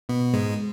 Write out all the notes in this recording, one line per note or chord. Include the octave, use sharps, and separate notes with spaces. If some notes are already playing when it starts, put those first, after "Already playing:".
B2 B3
G#2 G#3